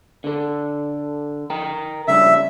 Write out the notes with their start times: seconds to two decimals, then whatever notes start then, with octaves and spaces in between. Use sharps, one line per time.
0.24 D3 A4
1.50 A#4 G5 A#5
2.08 C#3 G3 D4 E5